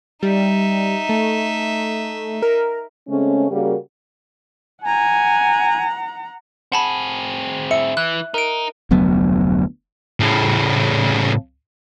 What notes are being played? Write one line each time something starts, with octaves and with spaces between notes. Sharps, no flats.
G3 D#4 E5
A3
A#4
C#3 G#3 A3 C4 C#4
C#3 G3 A#3 F#4 G4 A#4
F#5 G#5 A#5
C4 G#4 F#5 A5 B5
E5 C#7
E3 F#6
D#4 A#4 D7
F1 D2 F#3 B3
A2 C#3